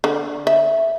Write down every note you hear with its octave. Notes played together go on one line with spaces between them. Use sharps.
D3
E5